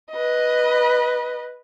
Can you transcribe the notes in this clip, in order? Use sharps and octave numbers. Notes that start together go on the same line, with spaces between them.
B4 D#5